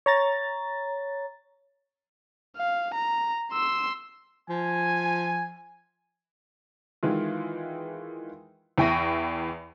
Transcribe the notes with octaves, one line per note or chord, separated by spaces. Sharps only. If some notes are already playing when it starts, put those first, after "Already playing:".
C#5 A#5 A6
F5
A#5
C6 E6
F3 G#5
D#3 E3 G#3 F4
E2 E4 G5 C#6 A#6 D#7